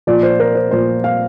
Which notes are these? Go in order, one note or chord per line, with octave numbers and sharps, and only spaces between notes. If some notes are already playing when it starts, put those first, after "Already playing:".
A#2 F3 D5
C5
A#4
C5
A#2 F3 C5
F5